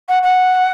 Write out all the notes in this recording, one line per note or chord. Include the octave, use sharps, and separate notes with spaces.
F#5
F#5